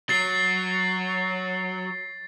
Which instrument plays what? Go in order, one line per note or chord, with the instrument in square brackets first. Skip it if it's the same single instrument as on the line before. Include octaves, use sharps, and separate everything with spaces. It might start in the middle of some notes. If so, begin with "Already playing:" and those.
[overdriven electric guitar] F#3 [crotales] A6 C7